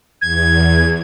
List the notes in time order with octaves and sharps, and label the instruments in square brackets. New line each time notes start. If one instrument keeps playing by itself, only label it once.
[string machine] E2 [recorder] G#6